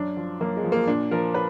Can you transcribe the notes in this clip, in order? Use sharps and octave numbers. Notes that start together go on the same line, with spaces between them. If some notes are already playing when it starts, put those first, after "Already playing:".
Already playing: F#2 D4
F3
F#2 A#3
G#3
F3
A#3
A#2 D4
F3 A#4
B4